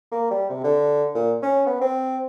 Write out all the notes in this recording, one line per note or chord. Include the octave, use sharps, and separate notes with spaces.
A#3
G3
C3
D3
A#2
C#4
B3
C4